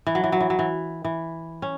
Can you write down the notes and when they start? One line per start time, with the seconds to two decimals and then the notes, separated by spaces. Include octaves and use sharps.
0.07 E3
0.15 F#3
0.24 E3
0.32 F#3
0.41 E3
0.50 F#3
0.59 E3
1.04 E3
1.62 C#4